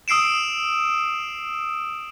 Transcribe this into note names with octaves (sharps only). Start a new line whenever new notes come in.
D#6 E6 C7 D7 E7